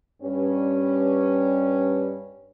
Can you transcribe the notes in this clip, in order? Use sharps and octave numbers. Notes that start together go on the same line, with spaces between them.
G2 C#4